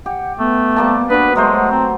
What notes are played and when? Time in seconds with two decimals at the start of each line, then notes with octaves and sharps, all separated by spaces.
0.06 G4 F#5
0.39 A3 B3
0.76 G3 A#3 A5
1.10 B3 D4 F#4 B4
1.36 F#3 G#3 A3 C5 A#5
1.71 C4